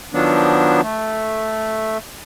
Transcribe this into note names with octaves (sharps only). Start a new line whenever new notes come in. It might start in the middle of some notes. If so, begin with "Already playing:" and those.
D#3 F3 F#3 B3 D4
A3